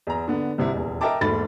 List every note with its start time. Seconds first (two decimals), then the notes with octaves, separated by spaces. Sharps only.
0.07 E2 A#5
0.28 D3 B3 D4
0.58 C2 C3 E4
0.74 D#1 E2
1.01 A#4 D#5 E5 G5 A5 D6
1.21 E1 G#2 A3 A#3 B5 A6